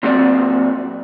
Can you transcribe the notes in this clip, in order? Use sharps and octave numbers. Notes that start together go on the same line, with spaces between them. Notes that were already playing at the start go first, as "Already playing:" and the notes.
A#2 F#3 C4 F#4 C#5 D5